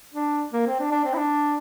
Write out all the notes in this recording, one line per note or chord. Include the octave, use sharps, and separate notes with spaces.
D4
A#3
C4
D4
D4
C4
E4
D4